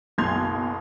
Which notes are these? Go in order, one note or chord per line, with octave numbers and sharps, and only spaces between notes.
F#1 B1 B2 C6 G#6 F7